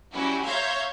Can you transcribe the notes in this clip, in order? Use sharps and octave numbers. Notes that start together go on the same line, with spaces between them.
F#3 G3 C#4 E4 F#4
C#5 E5 F5 A#5 C6 G6